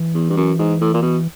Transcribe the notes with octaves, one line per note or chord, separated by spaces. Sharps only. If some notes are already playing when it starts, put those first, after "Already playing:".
Already playing: E3
E2
G2
F#2
G#2
A2
A#2
B2